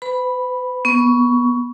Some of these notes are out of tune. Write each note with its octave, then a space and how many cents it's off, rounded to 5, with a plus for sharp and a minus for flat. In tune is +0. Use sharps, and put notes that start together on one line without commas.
B4 +45 B5 +0
B3 -15 C#6 +15